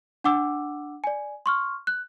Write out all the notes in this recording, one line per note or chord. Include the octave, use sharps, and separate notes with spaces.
D4 F#5 D6 E6
D5 G#5
C6 C#6 F6
F#6